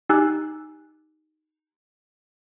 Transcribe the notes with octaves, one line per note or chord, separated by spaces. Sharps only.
D#4 G4 G#5 E6 F#6